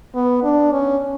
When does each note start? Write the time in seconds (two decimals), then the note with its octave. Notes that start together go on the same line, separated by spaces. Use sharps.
0.15 B3
0.43 D4
0.72 C#4